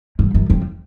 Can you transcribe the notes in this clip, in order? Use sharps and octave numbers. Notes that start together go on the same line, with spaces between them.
G2
F#2
F2